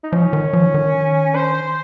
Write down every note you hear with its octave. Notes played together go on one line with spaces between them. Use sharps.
D#4
F3 C#4
D#3
F3
D#3
C5